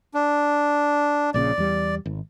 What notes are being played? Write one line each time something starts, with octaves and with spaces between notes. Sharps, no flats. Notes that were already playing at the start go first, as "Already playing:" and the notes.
D4
A#1 A#2 C#3 D5
E2 G3
G#1